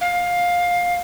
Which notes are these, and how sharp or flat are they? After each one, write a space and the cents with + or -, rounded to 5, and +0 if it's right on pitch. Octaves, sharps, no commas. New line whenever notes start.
F5 +15